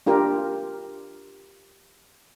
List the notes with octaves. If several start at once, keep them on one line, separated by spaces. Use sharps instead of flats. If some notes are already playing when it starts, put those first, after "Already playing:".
D4 F4 G4 A#4